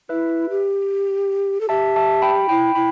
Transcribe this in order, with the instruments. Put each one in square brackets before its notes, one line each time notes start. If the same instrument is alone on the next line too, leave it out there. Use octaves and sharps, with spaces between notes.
[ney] E4 [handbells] B4 E5
[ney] G4
A4
[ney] G4 [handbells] E5 A5
[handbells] E5 A5
G5 B5
[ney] E4 [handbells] G5 B5
[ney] E4 [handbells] G5 B5